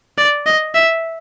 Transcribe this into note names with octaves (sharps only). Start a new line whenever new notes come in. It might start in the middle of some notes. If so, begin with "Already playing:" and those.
D5
D#5
E5